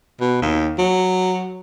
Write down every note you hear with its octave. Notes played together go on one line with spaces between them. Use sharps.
B2
D#2
F#3